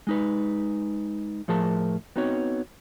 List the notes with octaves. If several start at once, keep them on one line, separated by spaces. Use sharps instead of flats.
G#3 D#4 B4
A2 F3 G#4 A#4 A5
B3 C4 D#4 F#4 C#5